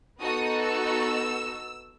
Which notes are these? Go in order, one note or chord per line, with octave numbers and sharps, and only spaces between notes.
B3 D#4 F#4 A4 D#6
E6